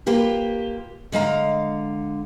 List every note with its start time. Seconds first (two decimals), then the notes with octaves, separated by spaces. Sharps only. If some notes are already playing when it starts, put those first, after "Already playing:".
0.06 A#3 F4 G4 B4
1.12 D3 G#3 F5 A#5